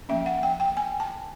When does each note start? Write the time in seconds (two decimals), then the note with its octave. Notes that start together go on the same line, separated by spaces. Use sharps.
0.09 F3 A#3 C#4 E5
0.26 F#5
0.43 G5
0.60 G5
0.77 G#5
1.00 A5